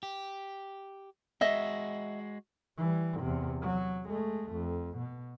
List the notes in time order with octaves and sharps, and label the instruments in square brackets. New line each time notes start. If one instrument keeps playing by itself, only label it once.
[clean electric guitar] G4
[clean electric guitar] G#3 F#4 [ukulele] D#5 E5
[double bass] E3 G3
E2 C3
F#3
G#3 A3
F2
B2